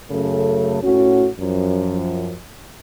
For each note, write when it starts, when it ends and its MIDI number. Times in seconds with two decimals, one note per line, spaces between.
0.11 0.79 42
0.11 0.79 49
0.11 0.79 57
0.11 0.79 69
0.83 1.27 45
0.83 1.27 61
0.83 1.27 66
1.40 2.35 42
1.40 2.35 53